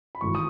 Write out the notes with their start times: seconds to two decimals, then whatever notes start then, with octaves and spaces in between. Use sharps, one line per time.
0.15 B5
0.21 G#1 G#2 E3 C#6
0.35 D#6